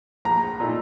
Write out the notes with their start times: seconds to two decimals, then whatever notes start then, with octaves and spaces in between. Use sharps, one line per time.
0.25 A#1 A#5
0.60 A#2 A3 D#4